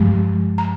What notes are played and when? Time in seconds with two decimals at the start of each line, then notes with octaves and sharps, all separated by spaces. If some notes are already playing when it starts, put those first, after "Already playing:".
Already playing: G2 F3 G#3
0.58 A#5